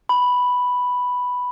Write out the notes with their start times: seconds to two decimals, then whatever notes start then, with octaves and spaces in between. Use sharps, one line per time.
0.09 B5